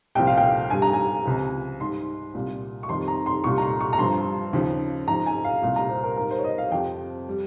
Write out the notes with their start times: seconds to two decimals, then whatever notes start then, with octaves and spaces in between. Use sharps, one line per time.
0.15 C2 A#2 F3 G5
0.27 F5
0.37 G5
0.70 G2 G3 G#5
0.82 A#5
0.93 G#5
1.25 C#2 C3 F3
1.80 G#2 G3 C6
2.34 C2 A#2 G3
2.83 C#6
2.89 F2 D#3 G3 C6
3.08 A#5
3.26 C6
3.44 C2 A#2 G3 C#6
3.58 A#5
3.62 C6
3.81 C#6
3.93 A#5
3.98 G2 F3 C6
4.53 D#2 C#3 F3
5.08 G#2 F3 A#5
5.26 G#5
5.44 F5
5.62 C2 A#2 G3 F5
5.76 A#5
5.89 C5
6.04 A#4
6.16 G#2 G3 A#4
6.31 C5
6.39 C#5
6.44 D#5
6.58 F5
6.72 F2 C3 F3 G5
7.28 G3